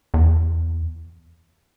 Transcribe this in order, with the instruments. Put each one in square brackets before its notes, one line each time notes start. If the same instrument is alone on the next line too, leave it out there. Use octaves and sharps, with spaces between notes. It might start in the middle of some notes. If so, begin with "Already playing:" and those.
[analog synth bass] E2